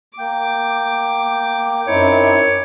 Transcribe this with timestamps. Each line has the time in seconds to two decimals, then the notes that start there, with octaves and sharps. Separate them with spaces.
0.19 A#3 G5 D6
1.87 F#2 C4 D#4 E4 C#5